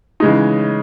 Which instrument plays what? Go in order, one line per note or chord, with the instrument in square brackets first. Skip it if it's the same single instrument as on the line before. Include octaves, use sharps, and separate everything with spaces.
[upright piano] C#3 E3 G#3 D#4